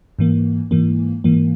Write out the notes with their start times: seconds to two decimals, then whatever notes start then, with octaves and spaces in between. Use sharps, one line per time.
0.19 G#2 E3 A#3
0.71 G#2 E3 A#3
1.24 G#2 E3 A#3